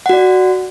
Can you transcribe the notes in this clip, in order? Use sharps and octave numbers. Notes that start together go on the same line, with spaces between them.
F#4 D5 F#5